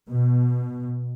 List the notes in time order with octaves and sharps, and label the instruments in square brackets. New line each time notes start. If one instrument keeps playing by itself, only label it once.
[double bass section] B2